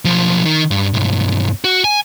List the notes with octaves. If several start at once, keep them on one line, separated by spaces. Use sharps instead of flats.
B1 F3
D#3
G2
B1 G2
F#4
G#5